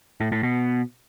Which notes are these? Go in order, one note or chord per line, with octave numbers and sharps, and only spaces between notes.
A2
A2
B2